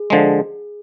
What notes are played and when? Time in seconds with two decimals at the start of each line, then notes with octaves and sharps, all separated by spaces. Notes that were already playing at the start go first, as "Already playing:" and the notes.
Already playing: G#4
0.10 D3 F3 G#3